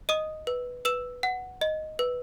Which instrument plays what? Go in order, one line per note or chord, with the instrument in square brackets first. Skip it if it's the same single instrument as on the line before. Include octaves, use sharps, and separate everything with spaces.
[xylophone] D#5 D#6 D#7
B4
B4 E6 E7
F#5
D#5
B4